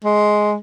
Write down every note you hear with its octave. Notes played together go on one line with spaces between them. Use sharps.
G#3